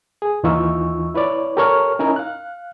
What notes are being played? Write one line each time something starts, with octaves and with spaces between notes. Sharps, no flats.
G#4
D#2 E3 D#4 F4 C#6 E6
E4 B4 C#5 D5
G4 A4 A#4 C#5 C#6 F6
C#4 D#4 E4 A#4 C#5 G#5
F5 F#6